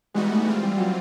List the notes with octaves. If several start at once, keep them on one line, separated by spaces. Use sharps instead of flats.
E3 G3 G#3 B3 D#4 F#4
A3
E3 G3 G#3 C4 F4
G3
F#3